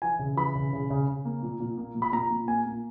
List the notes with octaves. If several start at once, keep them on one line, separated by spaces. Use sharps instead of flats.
E3 G#5
C#3
E3 B5
C#3
C#3
C#3
C#3
A#3
A#2
A#2
A#3
A#2
B5
A#2 A#5
A#2
A#3 G#5
A#3